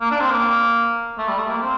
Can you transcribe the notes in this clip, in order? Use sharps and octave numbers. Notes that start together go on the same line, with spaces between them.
A#3
D4
C4
A#3
A3
G3
A3
A#3
C4